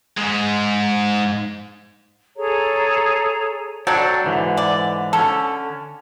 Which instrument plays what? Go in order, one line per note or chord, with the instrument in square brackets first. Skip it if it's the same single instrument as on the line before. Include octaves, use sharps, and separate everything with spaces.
[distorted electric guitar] G#2 G#3
[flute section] G#4 A4 C#5 A#5
[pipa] F#3 D4 [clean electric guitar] F#4 A4 G5
[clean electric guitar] G#2 D3 E3
[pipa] D5
[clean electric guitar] D3 C#4 [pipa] A4